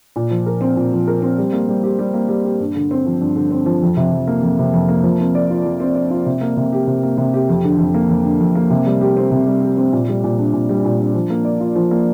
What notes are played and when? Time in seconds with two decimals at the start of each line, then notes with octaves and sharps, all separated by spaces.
0.16 A#2
0.31 F3
0.46 A#4
0.61 C4
0.76 A#2
0.92 F3
1.07 A#4
1.22 C4
1.38 G3
1.53 A#3
1.69 G3
1.83 G4
1.99 G3
2.14 A#3
2.29 G3
2.44 G4
2.60 G2
2.76 D3
2.91 C4
3.06 F3
3.21 G2
3.36 D3
3.51 C4
3.66 F3
3.83 F2
3.97 C3
4.12 F2
4.28 A#3
4.42 F2
4.59 C3
4.73 F2
4.89 A#3
5.03 F3
5.19 C4
5.35 D5
5.50 F4
5.65 F3
5.80 C4
5.95 D5
6.10 F4
6.26 C3
6.41 A#3
6.57 C3
6.73 G4
6.87 C3
7.03 A#3
7.18 C3
7.34 G4
7.49 F2
7.64 D3
7.79 F2
7.94 A#3
8.09 F2
8.25 D3
8.40 F2
8.55 A#3
8.70 C3
8.86 G3
9.01 G4
9.17 C4
9.31 C3
9.46 G3
9.62 G4
9.77 C4
9.92 A#2
10.08 G3
10.24 A#2
10.39 D4
10.53 A#2
10.69 G3
10.85 A#2
10.99 D4
11.14 F3
11.30 A#3
11.45 D5
11.60 F4
11.76 F3
11.91 A#3